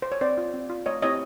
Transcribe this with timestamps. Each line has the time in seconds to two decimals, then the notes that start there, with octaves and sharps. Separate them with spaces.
0.02 C5
0.12 C#5
0.21 C4 C5 D5
0.37 F4
0.54 C4
0.70 F4
0.86 A3 C#5 D#5
1.02 C4 E4 G4 C#5 D#5